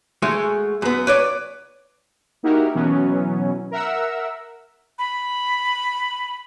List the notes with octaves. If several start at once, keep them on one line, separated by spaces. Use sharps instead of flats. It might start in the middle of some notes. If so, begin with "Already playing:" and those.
G#3 A3 F#4 G#4
F#2 B3
B4 C#5 D5
A#3 D#4 E4 F#4 G4 A#4
B2 E3 F#3 B3 C#4
A#4 E5 F#5 E6
B5